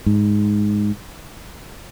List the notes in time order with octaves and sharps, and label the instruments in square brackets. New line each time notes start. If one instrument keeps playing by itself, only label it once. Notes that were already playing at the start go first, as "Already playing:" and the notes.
[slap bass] G#2